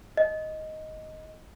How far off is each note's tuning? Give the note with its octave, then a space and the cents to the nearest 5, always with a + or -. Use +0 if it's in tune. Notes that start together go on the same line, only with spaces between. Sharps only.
D#5 +5